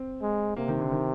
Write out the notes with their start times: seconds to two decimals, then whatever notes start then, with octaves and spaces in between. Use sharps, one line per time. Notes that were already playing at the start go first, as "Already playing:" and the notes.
Already playing: C4
0.22 G#3
0.56 C3 A#3
0.68 D#3
0.79 D3
0.91 D#3